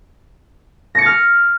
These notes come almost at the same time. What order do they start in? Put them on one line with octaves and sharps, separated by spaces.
A#6 C#7 A6 F6